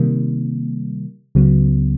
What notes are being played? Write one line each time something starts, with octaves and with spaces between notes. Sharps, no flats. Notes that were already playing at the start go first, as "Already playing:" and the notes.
Already playing: C3 D#3 G3 A#3
C#2 C#3 F#3 B3